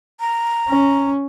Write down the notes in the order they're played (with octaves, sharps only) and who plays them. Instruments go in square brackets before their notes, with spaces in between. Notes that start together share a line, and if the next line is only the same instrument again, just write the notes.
[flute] A#5
[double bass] C#4